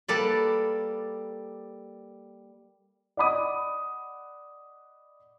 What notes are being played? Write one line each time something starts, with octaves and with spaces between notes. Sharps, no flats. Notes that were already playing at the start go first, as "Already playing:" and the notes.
G3 A#3 A4 B4 D5
D5 D#5 F#5 B5 D6 D#6